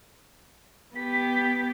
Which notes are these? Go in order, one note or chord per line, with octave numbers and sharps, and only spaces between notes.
B3 G4 B6